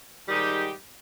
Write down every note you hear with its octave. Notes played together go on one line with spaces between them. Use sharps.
G#2 D#3 G3 D#4 G4